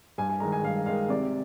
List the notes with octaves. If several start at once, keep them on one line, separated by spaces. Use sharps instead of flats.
G2 G#5
G#5
D#3 G#3 A#5
G#5
G2 F5
D#3 G#3 F5
C3 D5